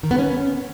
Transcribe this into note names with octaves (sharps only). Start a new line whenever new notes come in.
D#3
B3
C#4